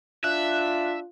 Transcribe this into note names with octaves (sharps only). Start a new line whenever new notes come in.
D4 F4 E5 F#6